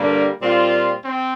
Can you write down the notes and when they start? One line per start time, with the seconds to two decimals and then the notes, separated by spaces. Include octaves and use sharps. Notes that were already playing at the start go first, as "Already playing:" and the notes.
Already playing: G2 D3 G3 A#3 D4
0.40 A#2 G3 C4 F4
1.04 C4